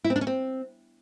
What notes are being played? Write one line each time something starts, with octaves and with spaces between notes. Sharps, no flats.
E4
C4
D4
C#4
C4